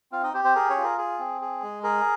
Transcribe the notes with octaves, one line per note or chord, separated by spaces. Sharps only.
C4 F4 F5
D#4 D#5
C4 G4 C5
C4 C5
G#4 A#4
C#4 C#5
F4
A#4
G#4
C4
G#4
G#3
G#4 A#4